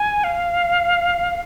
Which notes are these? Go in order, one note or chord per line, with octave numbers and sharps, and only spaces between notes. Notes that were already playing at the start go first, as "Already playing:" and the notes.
Already playing: G#5
F5